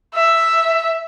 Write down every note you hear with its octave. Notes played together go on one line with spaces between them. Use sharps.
E5